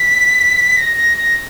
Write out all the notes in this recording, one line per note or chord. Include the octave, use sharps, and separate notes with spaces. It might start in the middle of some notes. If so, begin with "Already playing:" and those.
Already playing: B6
A#6
A#6
A#6